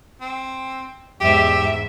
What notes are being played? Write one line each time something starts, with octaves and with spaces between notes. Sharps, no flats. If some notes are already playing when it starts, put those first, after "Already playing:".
C4
E2 G#2 G4 E5